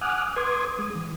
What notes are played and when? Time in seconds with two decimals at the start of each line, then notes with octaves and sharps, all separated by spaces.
0.01 F#5 G#5 D6 D#6 F6 F#6
0.36 B4 C6 D6 D#6 G#6
0.79 G#3 D#6
0.95 E3